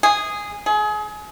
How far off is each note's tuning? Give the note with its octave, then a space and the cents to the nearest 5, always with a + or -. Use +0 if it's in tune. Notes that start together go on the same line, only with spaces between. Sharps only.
G#4 -10
G#4 +30